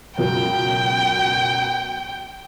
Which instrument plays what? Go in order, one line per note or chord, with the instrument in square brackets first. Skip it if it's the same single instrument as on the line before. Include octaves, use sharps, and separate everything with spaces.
[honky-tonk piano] C#2 F#2 B2 [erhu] G5